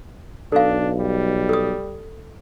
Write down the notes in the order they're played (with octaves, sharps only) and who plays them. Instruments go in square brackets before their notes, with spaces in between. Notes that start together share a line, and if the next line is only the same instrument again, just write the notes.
[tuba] B1 [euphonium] D4 [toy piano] A4 F5
[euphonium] G3
[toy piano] A4 D#6